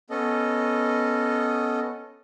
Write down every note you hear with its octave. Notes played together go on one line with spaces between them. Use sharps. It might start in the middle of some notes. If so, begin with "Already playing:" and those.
B3 C#4 A4 D#5